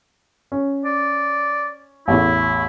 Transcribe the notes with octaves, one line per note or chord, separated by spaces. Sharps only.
C#4
D5
A1 E2 A2 E4